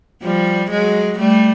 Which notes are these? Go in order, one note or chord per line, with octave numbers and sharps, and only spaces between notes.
F3 G3
F#3 G#3
G3 A3